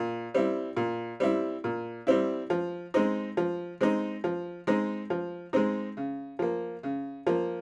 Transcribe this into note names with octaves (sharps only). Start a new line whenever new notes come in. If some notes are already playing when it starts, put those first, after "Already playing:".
Already playing: A#2
G3 C4 E4
A#2
G3 C4 E4
A#2
G3 C4 E4
F3
G#3 C4 D#4
F3
G#3 C4 D#4
F3
G#3 C4 D#4
F3
G#3 C4 D#4
C#3
F3 A#3
C#3
F3 A#3